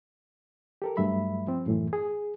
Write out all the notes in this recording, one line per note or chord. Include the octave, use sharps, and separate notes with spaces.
G4 A4 A#4
G2 F#3 A3 E5 B5
F3 C4
F#2 A2 E3
G#4